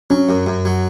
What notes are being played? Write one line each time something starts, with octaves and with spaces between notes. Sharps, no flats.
F#3 C#4
F#2
F#2
F#3